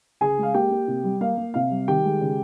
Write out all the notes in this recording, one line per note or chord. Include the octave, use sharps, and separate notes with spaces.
C#3 G#4 G#5
G#3
F5
A#3 G4 G5
A#3
C3
G3
A#3 F5
A#3
C3 F5
G3
D#3 G4 G5
G#3
C#3